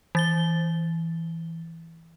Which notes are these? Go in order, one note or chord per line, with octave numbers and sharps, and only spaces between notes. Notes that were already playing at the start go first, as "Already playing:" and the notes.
E3 A6 G7